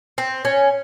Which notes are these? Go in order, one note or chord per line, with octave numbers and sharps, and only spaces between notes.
C4
C#4